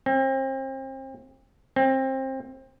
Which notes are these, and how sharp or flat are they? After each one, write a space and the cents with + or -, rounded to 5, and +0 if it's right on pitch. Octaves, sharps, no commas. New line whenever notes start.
C4 +35
C4 +25